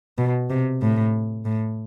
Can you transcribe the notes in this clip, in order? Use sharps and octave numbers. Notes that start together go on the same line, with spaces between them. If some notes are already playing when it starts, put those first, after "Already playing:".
B2
C3
A2
A2